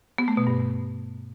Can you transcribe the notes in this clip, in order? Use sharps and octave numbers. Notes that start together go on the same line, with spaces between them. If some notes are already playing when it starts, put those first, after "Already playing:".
B3
A3
B2
G2